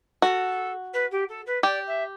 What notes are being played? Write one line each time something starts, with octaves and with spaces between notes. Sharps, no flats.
F#4 A4
B4
G4
A4
B4
G4 D5
E5